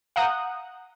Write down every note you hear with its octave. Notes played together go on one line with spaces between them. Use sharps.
F5 F#5 A#5 D#6 F#6 G6